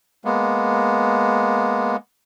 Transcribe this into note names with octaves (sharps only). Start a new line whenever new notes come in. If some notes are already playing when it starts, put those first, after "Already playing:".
G#3 A#3 B3